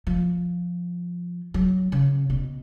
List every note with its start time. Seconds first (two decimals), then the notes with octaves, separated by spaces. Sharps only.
0.07 F3
1.54 F#3
1.92 C#3
2.30 B2